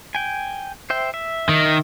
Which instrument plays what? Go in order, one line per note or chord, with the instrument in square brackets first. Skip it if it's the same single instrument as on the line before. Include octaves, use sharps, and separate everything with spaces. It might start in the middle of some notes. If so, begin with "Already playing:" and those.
[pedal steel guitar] G5 G#5
C5 E5 G5
E5
[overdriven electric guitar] D#3